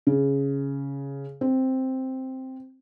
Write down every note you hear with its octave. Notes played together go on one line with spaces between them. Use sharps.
C#3
C4